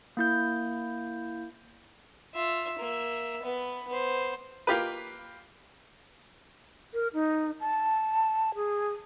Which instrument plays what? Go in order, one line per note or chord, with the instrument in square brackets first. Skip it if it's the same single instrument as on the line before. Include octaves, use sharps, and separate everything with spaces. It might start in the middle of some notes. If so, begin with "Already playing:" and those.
[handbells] A#3 E4 G6
[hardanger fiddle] F4 E5
A#3 E5
B3 B4
B3 C5
[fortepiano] A#3 F4 G4 B4
[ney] A#4
D#4
A5
G#4